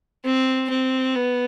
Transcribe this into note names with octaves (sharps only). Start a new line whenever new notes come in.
C4
C4
B3